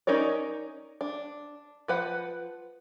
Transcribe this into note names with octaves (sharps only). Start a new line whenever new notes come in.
C#4 D#4 A#4 C#5 D5
D4
F3 B4 F#5